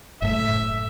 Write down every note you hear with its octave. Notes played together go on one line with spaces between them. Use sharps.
F#1 A2 A3 E5